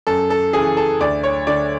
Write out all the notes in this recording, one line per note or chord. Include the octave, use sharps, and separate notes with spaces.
F#2 A4
A4
C#3 E3 G#4
A4
D2 D5
C#5
D3 D5